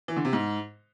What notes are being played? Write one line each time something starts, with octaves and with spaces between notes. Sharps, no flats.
E3
D3
C3
G#2